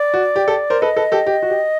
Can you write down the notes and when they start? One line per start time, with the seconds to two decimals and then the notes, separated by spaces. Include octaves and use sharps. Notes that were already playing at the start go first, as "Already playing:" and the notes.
Already playing: D5
0.14 F#4
0.36 G4
0.48 G4 A4
0.70 A#4 C5
0.81 A4 B4 D#5
0.97 A4 B4
1.12 G4 A4
1.27 G4
1.43 F#4
1.50 G4